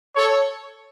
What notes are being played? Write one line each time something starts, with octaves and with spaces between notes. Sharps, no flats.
A4 C#5